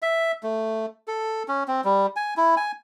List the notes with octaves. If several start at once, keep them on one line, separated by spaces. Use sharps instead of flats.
E5
A3
A4
C#4
C4
G3
G#5
E4
G#5